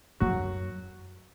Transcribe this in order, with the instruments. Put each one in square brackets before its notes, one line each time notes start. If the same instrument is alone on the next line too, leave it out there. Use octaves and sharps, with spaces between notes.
[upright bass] F#2 [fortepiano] F#3 F#4